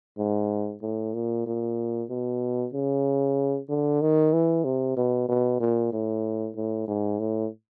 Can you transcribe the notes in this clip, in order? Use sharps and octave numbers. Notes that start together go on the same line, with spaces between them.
G#2
A2
A#2
A#2
B2
C#3
D3
D#3
E3
C3
B2
B2
A#2
A2
A2
G#2
A2